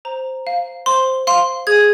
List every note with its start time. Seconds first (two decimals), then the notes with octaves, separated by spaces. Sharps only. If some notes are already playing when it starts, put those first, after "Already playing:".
0.05 C5 A#5
0.47 F5
0.86 C5 C6
1.27 F5 C6
1.67 G#4 G#6